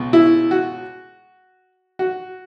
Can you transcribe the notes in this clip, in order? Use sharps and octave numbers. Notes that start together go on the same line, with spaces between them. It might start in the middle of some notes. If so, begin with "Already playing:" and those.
Already playing: C#2 B2
E4
F#4
F#4